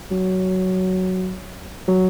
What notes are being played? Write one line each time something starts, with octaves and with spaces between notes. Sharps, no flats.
F#3
F#3